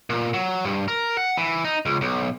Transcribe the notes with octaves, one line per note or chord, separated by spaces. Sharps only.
A#2
F#3
G2
A#4
F#5
E3
D#4
C#2
B1